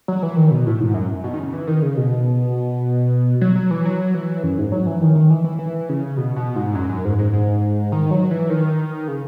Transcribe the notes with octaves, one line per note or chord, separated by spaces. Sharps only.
F#3
E3
D#3
B2
A2
G#2
F#2
B2
D#3
C#3
E3
D#3
C#3
B2
F#3
F#3
E3
F#3
E3
F#2
G#2
F#3
E3
D#3
D#3
E3
E3
E3
C#3
B2
B2
G#2
F#2
F#2
G#2
G#2
G#2
D#3
F#3
E3
D#3
C#3